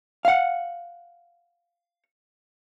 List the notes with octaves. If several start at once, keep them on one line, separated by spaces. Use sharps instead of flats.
F5 F#5